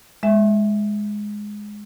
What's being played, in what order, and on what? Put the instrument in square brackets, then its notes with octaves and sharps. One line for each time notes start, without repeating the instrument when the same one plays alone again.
[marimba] G#3 E5